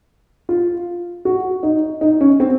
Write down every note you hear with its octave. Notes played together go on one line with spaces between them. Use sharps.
F4
F#4
D#4
D#4
C#4
C4